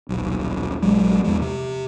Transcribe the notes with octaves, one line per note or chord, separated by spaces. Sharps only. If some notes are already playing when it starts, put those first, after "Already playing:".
D#1 B1
A#1 E2 F#3 G#3
E2 F3 G#3
C3